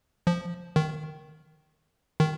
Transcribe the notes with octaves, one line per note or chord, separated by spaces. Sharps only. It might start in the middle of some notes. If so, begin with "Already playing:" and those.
F3
D#3
D#3